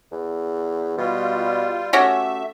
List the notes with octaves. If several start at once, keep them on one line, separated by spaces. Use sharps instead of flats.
E2
B2 G3 F4
A3 C#4 F#4 G4 E5